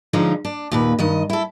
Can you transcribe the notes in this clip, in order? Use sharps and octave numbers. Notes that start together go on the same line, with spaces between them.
D3 F3 G#3 C#4 D#4
D4
D#2 A#2 B4
G2 D#3 D#5
E4 A4